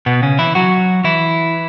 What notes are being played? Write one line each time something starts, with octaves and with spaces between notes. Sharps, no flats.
B2 B3
C#3 C#4
E3 E4
F#3 F#4
E3 E4